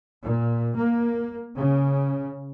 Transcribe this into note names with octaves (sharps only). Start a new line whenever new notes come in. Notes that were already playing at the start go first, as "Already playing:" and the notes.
A#2
A#3
C#3